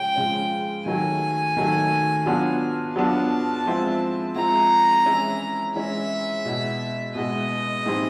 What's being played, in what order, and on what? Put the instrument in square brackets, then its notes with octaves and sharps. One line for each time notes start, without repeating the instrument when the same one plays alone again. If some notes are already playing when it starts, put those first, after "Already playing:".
Already playing: [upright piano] C#3 F3 G#3 C#4 [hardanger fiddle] G5
[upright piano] C#3 F3 G#3 C#4
[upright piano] D#3 F#3 A3 [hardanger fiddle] G#5
[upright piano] D#3 F#3 A3
F#3 B3 D4 F4
[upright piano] F#3 B3 D4 F4 [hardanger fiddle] A5
[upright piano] F3 G#3 C4 E4
[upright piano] F3 G#3 C4 E4 [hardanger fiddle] A#5
[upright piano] E3 G#3 C#4 E4
[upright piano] E3 G#3 C#4 E4 [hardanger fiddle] E5
[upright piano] B2 G#3 B3 E4
[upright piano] B2 G#3 B3 E4 [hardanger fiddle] D#5
[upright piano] A2 E3 G3 C4 D#4